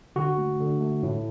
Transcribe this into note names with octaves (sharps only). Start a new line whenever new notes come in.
D3 F#4
A3
D3
A3
A2